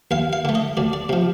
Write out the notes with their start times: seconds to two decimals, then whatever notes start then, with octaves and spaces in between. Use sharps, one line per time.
0.11 D#2 F5
0.33 F5
0.45 D3 A3
0.55 D#5
0.77 D2 D5
0.93 D5
1.09 C3 F3